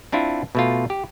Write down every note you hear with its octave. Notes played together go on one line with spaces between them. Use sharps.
C4 D4 E4 F4
B2 A3 F4
G4